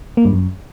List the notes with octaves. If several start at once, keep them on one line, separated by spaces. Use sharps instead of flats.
A#3
G2
F#2